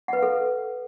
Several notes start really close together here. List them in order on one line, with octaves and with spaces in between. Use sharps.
F#5 B4 F5 A4